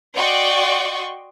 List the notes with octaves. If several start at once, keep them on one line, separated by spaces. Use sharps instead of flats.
F#4 D5 D#5 G5 C6 C#6